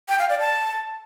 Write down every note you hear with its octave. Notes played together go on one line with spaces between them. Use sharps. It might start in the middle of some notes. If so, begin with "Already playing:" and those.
G5
F5
D5
A5